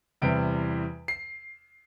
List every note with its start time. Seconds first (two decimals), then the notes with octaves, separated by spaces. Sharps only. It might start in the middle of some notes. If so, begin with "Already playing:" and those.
0.22 E2 C3 E3 G3 D7
1.08 C7